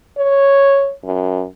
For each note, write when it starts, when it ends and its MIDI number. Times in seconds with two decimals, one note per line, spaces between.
0.18 0.93 73
1.05 1.45 42